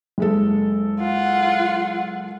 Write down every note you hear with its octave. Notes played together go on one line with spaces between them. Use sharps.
F#1 G#3 A4
F4 F#5